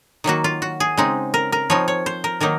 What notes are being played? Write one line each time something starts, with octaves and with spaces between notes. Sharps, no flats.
D#3 F#3 A#3 F#4
F4
F#4
G#4
C#3 G#3 C4 D#4
A#4
A#4
F3 C4 D#4 C#5
C#5
C5
A#4
D#3 F#3 A#3 D#4 A#4